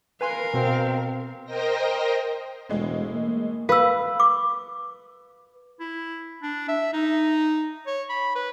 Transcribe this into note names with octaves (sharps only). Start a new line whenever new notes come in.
A#4 B4 F5 G#5 C6
B2 C4
A#4 C5 D#5 G5 A#6
E1 A2 G#3
A#3
B4 F5 E6
D6
E4
D4
E5
D#4
C#5
B5
B4